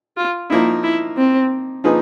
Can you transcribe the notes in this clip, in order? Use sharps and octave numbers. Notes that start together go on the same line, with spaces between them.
F4
F3 A#3 D#4 E4
E4
C4
F3 A#3 D#4 G#4 B4